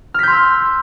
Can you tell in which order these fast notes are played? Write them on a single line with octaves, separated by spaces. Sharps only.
F6 B6 G6 C6 E6